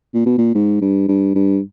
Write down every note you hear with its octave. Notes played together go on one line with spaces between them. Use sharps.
A#2
B2
A#2
G#2
G2
G2
G2